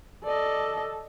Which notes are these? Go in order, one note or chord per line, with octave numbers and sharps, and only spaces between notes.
A4 D5 D#5